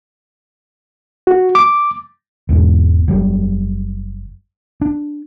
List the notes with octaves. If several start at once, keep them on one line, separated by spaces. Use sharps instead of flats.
F#4
D6
E1 E2 G#2
F#1 F#3 G3
D4